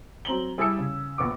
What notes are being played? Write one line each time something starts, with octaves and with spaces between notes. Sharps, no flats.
F#3 C4 A#5 F#7 G7
G3 E4 G#4 A5 E6 C#7
C#3
A#1 B3 C#6 D6